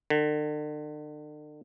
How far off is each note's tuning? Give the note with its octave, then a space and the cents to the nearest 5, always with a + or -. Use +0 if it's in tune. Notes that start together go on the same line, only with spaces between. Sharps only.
D3 +40